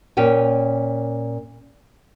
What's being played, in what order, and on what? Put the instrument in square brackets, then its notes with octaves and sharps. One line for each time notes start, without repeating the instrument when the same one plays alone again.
[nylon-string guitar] A#2 C#4 G5 G#5